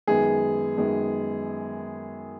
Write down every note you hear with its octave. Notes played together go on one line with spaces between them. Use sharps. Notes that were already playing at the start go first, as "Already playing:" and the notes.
F#2 D#3 G#3 B3 G#4
F#2 D#3 G#3 B3